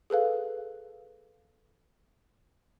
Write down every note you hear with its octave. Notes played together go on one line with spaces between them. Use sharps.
G#4 A4 B4 F5